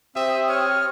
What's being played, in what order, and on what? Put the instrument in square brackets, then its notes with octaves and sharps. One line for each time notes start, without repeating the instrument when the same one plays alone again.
[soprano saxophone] C4 [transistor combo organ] G4 D#6 [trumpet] E5
[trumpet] C#5 [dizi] F6